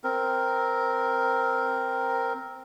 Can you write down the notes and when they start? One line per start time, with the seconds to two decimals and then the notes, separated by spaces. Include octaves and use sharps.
0.04 C4 A#4